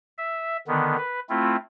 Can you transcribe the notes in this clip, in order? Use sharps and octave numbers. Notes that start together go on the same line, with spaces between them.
E5
D3 D#3 B3
B4
A3 C4 E4 F4